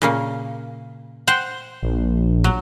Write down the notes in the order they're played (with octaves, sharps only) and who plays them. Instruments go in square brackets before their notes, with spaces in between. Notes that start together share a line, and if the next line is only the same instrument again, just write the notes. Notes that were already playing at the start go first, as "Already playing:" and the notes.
[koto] A#2 C#3 A#3
C5 F#5 G5
[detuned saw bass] A#1
[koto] F#3